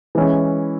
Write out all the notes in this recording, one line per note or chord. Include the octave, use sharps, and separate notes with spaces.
E3 G#3 C#4 E4